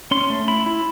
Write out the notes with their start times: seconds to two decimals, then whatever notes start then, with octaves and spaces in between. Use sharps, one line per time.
0.11 C#4 C6
0.30 A3
0.48 E4 B5
0.66 E4